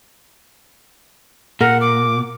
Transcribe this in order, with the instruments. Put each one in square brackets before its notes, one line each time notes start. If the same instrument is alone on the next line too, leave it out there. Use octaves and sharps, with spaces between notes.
[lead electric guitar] A#2 [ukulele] A#4 [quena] F#5
[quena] D6